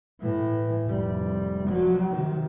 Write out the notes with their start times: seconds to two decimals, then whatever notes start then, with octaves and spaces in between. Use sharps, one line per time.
0.21 A2 E3
0.87 F1 G3
1.68 F3 F#3
2.11 C3 D#3